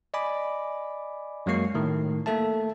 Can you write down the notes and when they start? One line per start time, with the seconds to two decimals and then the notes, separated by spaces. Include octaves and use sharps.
0.14 D5 D#5 G#5 B5 D6
1.46 F#2 F#3 G#3 A#3 C#6 C7
1.74 A2 D#3 A3
2.26 A3 A#3 A4 E5 A5